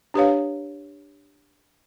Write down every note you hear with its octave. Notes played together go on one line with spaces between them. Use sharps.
D4 G4 B4 C#5 F5